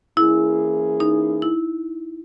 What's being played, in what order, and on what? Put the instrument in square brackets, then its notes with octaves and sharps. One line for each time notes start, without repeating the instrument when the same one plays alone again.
[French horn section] E3 A#3 C#4 G#4 [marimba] E4
[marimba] D#4
E4